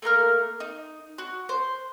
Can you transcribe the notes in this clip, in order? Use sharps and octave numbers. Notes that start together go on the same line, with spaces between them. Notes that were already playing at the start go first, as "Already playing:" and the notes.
A3 A#3 A#4 F6
D#4
F#4
C5